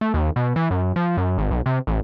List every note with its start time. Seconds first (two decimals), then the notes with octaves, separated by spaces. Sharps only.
0.01 A3
0.14 D#2
0.36 B2
0.56 E3
0.71 F#2
0.96 F3
1.17 F#2
1.38 G#1
1.51 B1
1.66 C3
1.87 A1